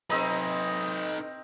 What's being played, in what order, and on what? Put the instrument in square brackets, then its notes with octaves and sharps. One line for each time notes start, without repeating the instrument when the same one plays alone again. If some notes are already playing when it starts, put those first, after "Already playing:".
[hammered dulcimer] C4 D#5 A#5 [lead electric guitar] D#4 B4